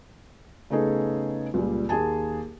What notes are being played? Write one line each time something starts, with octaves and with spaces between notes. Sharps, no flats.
C#3 A3 B3 D#4 G#4 A4
C#2 A#2 G3
D#2 G#4 G#5 A5